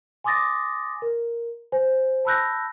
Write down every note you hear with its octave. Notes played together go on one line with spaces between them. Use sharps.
G#5 C6 D6 D#6 A6 A#6
A#4
C5 G#5
A5 B5 E6 F#6 G6 A#6